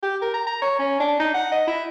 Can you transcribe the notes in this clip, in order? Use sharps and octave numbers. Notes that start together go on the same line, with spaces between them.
G4
A#4
A#5
A#5
C#5
C#4
D4
D#4
F#5
D#5
E4